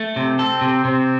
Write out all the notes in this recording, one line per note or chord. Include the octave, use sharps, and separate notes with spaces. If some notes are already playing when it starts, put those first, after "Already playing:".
Already playing: A3
C3 C4
A4
C3
C3 C4